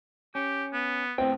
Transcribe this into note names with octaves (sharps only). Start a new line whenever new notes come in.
C#4 G4
B3
A2 B3 C4 G5